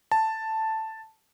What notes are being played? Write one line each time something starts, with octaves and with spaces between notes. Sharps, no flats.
A5